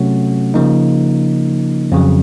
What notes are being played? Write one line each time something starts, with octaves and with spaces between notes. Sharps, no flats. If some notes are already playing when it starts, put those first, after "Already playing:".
Already playing: C3 F#3 A3 C#4 F#4
C#3 F3 A#3 D#4
F2 C#3 F#3